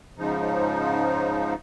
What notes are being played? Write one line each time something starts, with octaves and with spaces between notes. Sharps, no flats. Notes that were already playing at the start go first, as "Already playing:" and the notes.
G#2 C#3 F3 D#4